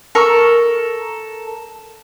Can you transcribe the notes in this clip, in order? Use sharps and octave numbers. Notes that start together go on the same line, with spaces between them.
A4 A#4 C#6